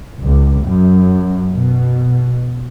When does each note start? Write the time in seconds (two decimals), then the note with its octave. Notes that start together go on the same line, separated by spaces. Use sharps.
0.19 C#2
0.62 F#2
1.53 B2